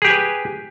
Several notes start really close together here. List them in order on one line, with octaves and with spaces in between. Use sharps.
G#4 G4 G#5 B4